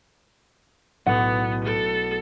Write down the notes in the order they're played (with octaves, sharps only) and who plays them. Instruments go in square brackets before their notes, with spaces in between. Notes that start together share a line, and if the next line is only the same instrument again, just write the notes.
[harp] B1 A2 A3 [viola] B3 [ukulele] F#5
[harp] B3 D7 [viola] A4